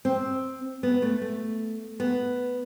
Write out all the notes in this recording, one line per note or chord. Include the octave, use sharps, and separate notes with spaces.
C4
B3
A3
A3
B3